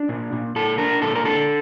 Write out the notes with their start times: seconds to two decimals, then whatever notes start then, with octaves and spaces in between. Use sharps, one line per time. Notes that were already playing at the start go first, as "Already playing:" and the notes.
Already playing: D4
0.09 A#2
0.33 A#2
0.56 A#2 A4
0.78 D4 A#4
1.02 A#2 A4
1.15 A#4
1.25 D4 A4